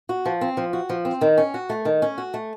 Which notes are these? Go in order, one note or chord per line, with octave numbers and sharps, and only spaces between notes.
F#4
F3
C4
F3
F#4
F3
C4
D#3
C#4
F#4
A3
D#3
C#4
F#4
A3